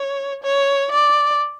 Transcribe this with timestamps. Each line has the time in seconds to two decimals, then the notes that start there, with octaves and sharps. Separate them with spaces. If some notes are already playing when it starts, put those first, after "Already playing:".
Already playing: C#5
0.43 C#5
0.91 D5